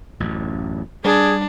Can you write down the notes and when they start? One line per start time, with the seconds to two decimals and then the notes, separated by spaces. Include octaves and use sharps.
0.20 A1 F#2
1.04 G3 D4 G#4